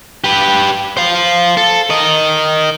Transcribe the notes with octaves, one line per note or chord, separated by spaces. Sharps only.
G4 B4
C5 F5
A4
A#4 D#5